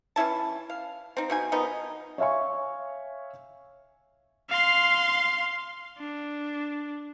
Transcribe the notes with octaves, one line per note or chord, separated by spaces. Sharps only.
E3 C#4 E4 A5
F5
C4 D#4
B2 D#4 G#5
D#3 F3 B3 D#4
C#5 E5 F5 G#5 C#6
F5 C6
D4